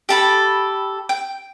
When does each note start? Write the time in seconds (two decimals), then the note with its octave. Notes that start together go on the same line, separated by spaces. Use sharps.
0.09 G4 A4 B5
1.09 G5